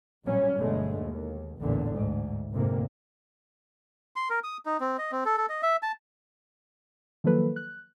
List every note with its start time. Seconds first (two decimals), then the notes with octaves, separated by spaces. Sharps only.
0.24 A1 A#2 F#3 G3 C#4
0.56 G1 B2 D3 G#3 A3
0.99 D#2
1.60 A1 E2 A#2 D3
1.93 D2 G#2
2.53 F1 D2 G#2 C3 A#3
4.16 C6
4.30 A#4
4.44 D#6
4.66 D#4
4.80 C4
4.98 D#5
5.12 C4
5.25 A4
5.38 A4
5.49 D#5
5.63 E5
5.83 A5
7.24 D#3 F3 F#3 A#3 A4 B4
7.56 F#6